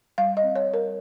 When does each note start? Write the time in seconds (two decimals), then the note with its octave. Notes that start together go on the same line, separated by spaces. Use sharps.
0.18 G3 F5
0.37 D#5
0.43 C4
0.56 C#5
0.68 G3
0.74 A#4